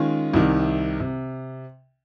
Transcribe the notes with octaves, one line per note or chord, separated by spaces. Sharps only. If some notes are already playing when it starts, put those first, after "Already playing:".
Already playing: D#3 G#3 C#4 F4
C2 C3 D#3
C3